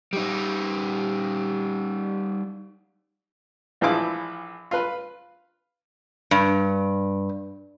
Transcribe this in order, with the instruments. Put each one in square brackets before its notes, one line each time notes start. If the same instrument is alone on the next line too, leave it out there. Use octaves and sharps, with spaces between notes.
[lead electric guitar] G3 D#4
[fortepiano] A#1 E3 F3 E4 F5 D6
F4 B4
[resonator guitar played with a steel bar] G2